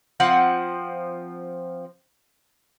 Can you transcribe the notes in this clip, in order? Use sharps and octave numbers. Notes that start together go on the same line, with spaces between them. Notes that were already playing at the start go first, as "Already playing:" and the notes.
F3 C4 F#5